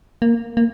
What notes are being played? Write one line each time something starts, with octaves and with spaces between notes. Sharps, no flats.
A#3
A#3